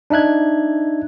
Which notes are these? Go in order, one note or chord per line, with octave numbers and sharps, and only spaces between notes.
D4 D#4 E5 F#6 G#6